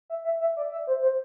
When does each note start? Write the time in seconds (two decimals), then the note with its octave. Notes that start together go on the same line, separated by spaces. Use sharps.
0.10 E5
0.24 E5
0.40 E5
0.57 D5
0.72 E5
0.87 C5
1.02 C5